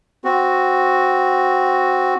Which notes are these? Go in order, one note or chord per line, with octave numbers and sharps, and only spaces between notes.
C4 F#4